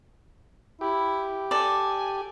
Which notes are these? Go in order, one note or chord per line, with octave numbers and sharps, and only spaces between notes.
E4 G4
A4 D5 G#5